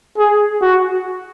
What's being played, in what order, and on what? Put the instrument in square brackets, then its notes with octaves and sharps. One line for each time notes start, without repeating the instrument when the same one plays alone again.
[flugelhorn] G#4
F#4